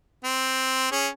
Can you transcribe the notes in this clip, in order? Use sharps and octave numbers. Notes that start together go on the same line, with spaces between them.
C4
C#4 G#4